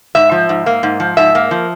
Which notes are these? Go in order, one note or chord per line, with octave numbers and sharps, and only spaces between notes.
G#2 E5
F3
G#2
A#3
G#2
F3
G#2 E5
A#3
F3